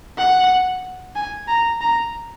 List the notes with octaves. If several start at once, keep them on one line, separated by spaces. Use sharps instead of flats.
F#5
G#5
A#5
A#5